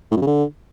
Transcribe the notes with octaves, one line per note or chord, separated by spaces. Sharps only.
A2
F#2
C#3
D3